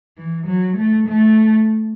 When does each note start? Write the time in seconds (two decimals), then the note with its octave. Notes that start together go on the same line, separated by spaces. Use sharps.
0.18 E3
0.47 F#3
0.77 A3
1.08 A3